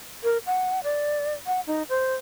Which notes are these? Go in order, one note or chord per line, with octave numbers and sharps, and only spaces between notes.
A#4
F#5
D5
F#5
D#4
C5